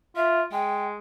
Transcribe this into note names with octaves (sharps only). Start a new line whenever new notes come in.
F4 E5
G#3 G5